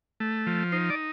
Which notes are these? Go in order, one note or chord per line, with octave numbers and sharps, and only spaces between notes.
A3
F3
D#4 C5
D5